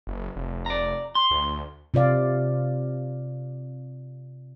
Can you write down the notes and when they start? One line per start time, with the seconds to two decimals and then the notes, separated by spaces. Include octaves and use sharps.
0.07 F#1
0.36 F1
0.66 D5 A#5
1.15 C6
1.31 D2
1.94 C3 F4 D5 F5